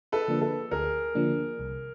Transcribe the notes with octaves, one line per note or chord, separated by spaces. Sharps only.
A4 B4
D3 F3 A#3 D4
A4
D2 G#4 A#4
D3 F3 A#3 D4
C2